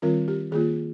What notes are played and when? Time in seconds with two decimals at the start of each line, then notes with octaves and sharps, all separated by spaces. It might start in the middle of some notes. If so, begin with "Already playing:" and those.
0.02 D#3 G3 C4 F4 A#4
0.28 G4
0.52 D#3 A#3 F4 G#4